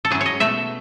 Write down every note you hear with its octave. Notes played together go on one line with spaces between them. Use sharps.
A4
F#3 C#4 E4 G#4
C#5 D#5
B2 A3 E4 E5